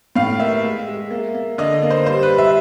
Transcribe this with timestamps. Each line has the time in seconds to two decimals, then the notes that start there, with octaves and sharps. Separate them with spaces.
0.16 A2 F5
0.40 A#3 E5
0.63 G#3
0.88 G#3
1.10 A#3
1.34 A#3
1.58 D3 D#5
1.83 A#3
1.90 C5
2.06 G3 C5
2.23 B4
2.30 G3
2.38 E5